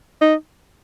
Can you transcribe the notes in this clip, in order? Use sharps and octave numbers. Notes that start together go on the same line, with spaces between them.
D#4